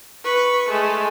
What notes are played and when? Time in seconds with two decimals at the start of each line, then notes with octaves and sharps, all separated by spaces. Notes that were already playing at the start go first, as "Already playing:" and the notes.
0.24 B4 C#6
0.69 G#3 A3